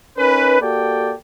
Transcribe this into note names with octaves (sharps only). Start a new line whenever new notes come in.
C#4 D#4 A#4 B4
A#3 F#4 G4 A4 D5 G5